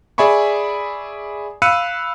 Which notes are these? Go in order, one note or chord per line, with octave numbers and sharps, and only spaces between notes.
G#4 D5 E5 G#5 B5 C#6
F5 B5 E6 F#6 C#7 D#7